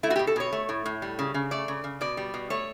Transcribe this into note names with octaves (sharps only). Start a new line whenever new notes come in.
A3 E4
F#4
G4
B2
A4
B2 C#5
A3
A2
A2
G3
C#3
C#3
A3 D5
C#3
C#3
B2 D5
G3
B2
A3 C#5